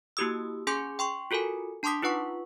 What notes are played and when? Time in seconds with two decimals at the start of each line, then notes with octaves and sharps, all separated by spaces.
0.17 A#3 E4 F#4 G4 D#6 E6
0.67 C#4 G#4 G#5 C6 D6 G6
0.99 G5 C6 C#6
1.31 F4 F#4 A4 A#4 G#5
1.83 D4 A5 C6 D6 D#6 B6
2.02 D#4 F4 B4 F#5 C#6